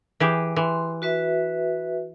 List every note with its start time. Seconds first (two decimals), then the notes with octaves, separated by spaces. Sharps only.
0.20 E3 G4 G#4
0.56 E3 C6
1.02 F#4 B4 E5